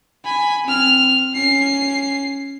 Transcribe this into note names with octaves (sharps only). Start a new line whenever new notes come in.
G#5 B5
C4 F6
C#4 C7